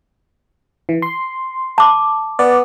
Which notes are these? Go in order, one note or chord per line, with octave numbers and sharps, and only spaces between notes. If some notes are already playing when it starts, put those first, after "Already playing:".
E3
C6
A5 D6
B3 D5